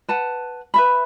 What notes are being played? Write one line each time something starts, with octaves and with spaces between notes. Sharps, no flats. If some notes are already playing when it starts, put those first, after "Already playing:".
B4 F#5 A5
B4 E5 B5